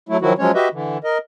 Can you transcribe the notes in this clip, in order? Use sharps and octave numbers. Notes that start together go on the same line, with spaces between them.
F#3 A3 E4
D#3 F3 F#3 E4 F#4
F3 F#3 G#3 C#4 C#5
F#4 G4 B4 D#5 E5
D3 E3
A#4 D#5